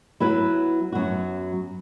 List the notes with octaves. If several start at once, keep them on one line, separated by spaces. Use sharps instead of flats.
F#3 B3 E4 B4
F#2 F#3 B3 F#4